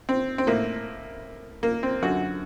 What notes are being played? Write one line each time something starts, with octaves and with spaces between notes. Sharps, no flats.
C4
C4
A2 A#3
A#3
C4
F#2 D3 F#4